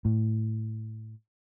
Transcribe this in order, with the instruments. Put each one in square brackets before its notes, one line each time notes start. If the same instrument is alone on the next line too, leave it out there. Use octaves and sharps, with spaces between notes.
[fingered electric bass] A2